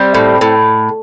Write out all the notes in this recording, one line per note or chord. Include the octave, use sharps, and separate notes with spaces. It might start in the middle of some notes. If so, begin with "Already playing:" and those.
Already playing: G3 C4
A2
A2